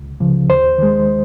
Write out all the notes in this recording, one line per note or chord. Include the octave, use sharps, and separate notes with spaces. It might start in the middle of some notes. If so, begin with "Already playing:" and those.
Already playing: C#2
C#3 F3
D#2 C5
D#3 G#3